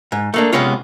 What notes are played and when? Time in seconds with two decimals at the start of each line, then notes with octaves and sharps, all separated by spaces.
0.12 G#2
0.34 A3 A#3 D4
0.53 C3 G#3 B3 C#4 F4